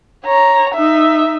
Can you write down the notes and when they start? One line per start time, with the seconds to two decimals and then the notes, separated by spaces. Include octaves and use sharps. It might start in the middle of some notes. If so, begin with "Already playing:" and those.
0.25 C#5 A#5
0.74 D#4 E5